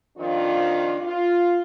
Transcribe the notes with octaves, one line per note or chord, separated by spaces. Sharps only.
F2 D#3 F3 D4 F4
F4